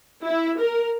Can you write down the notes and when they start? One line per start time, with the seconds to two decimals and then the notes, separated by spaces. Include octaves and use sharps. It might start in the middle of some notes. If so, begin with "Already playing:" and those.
0.24 E4
0.59 A#4